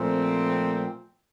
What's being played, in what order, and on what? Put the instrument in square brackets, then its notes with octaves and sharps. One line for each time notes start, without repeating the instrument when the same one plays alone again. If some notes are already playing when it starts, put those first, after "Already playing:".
Already playing: [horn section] A#2 F3 A3 C4